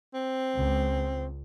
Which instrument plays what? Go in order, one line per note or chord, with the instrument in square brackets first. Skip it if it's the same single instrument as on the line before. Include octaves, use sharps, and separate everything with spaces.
[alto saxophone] C4
[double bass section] C#2